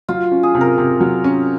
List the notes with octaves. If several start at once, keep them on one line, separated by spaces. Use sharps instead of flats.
F#3 F4
C#4
G#4
C3
A#4
C3
F#3
C#4